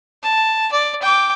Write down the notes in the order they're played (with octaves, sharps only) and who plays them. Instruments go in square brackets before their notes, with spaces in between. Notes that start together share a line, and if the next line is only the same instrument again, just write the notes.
[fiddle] A5
D5
G5 D6